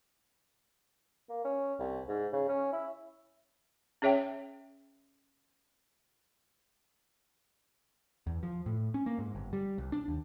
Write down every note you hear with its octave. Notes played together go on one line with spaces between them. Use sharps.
A#3
C#4
C2
G#2
C#3
C#4
E4
C#4 G#4 C#5 E5 G5
E2
F3
A2
C#4
A#3
G#2
G1
G3
C2
D4
D#2